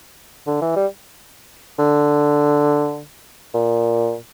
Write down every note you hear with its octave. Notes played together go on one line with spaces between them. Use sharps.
D3
E3
G3
D3
A#2